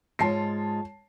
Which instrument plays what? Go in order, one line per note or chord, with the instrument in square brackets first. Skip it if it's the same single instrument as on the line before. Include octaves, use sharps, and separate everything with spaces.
[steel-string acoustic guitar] G#2 G#3 F4 [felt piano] C#5 A5 C7